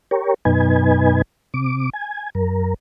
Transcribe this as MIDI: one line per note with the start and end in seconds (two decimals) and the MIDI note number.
0.11 0.34 67
0.11 0.34 70
0.11 0.34 73
0.45 1.22 42
0.45 1.22 47
0.45 1.22 63
0.45 1.22 71
0.45 1.22 80
1.54 1.90 48
1.54 1.90 86
1.93 2.30 80
2.35 2.74 42
2.35 2.74 70